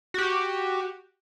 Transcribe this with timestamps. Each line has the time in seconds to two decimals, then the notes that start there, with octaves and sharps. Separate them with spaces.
0.14 F#4 G4